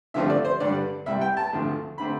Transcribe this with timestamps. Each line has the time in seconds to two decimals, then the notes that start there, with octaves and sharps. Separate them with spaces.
0.14 G2 D3 F3 A3 C4 E5
0.30 D5
0.45 C5
0.60 G2 D3 G3 D5
1.06 C2 C3 G3 E5
1.21 G5
1.37 A5
1.53 D2 D3 F3 A3 C4
1.98 D3 A3 C4 B5